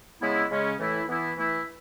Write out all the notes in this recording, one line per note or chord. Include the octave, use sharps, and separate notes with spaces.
C#3 G#3 B3 E4
C#3 G#3 C#4
A2 E3 A3 E4
E3 B3 E4
E3 A3 E4